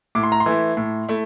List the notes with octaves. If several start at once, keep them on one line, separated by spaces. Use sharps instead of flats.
A2 D6
C6
A#5
C6
E3 A3 E4
A2
A3 E4